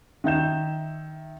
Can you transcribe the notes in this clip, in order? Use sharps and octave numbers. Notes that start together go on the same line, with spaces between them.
D#3 E5 G6 E7